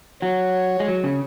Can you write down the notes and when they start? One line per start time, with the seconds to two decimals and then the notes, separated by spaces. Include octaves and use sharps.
0.22 F#3 C#5
0.80 G#3
0.88 F#3
1.04 C#3